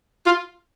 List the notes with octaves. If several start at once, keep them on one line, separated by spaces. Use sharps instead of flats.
F4